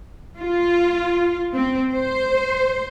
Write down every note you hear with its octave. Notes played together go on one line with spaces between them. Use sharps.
F4
C4
C5